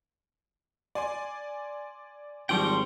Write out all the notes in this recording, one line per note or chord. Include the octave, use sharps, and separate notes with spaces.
D5 G#5 C6
G#1 F3 G3 G5 A#5 C6 C#6